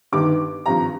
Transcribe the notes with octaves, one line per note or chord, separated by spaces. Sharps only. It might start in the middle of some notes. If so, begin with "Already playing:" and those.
G1 G2 D#3 D6
G#1 G2 F3 A#5